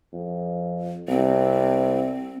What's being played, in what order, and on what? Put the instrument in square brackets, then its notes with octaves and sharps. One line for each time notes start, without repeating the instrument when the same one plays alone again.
[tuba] F2
[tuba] C2 [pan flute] C4